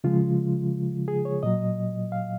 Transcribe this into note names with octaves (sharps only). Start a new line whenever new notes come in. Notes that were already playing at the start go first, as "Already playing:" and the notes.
C#3 F3 G#3 F4
G#4
C#5
A#2 F#3 D#5
F5